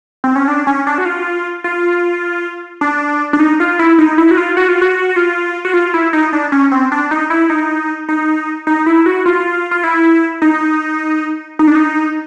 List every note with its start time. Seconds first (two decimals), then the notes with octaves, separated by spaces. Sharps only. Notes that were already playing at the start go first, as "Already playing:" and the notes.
0.24 C4
0.36 C#4
0.48 D4
0.67 C#4
0.87 D4
0.98 F#4
1.05 F4
1.64 F4
2.81 D4
3.33 D4
3.39 D#4
3.60 F4
3.79 E4
3.99 D#4
4.18 E4
4.31 F#4
4.37 F4
4.57 F#4
4.69 F4
4.82 F#4
5.09 F#4
5.16 F4
5.65 F#4
5.74 F4
5.94 E4
6.13 D#4
6.33 D4
6.52 C#4
6.72 C4
6.92 D4
7.11 D#4
7.30 E4
7.50 D#4
8.08 D#4
8.67 D#4
8.86 E4
9.06 F#4
9.26 F4
9.71 F4
9.84 E4
10.42 D#4
11.59 D#4
11.67 D4
11.75 D#4